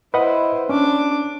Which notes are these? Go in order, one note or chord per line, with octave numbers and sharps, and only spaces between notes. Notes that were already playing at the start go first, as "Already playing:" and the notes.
E4 B4 C5 D#5 F#5
C#4 D4 D6